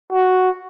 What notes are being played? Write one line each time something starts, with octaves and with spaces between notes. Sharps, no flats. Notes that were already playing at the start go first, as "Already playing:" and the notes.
F#4